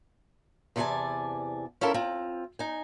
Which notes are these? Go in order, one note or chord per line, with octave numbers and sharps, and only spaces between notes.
E2 C3 E3 D5 G#5 A5
C#4 E4 F4 A4 A#4
C4 F4
D#4 G#5